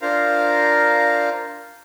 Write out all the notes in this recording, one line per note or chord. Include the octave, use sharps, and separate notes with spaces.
D4 F4 A#4 C5 F5 A#5